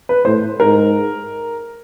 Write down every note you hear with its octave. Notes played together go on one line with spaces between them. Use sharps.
B4
A2 C5
G#2 A#4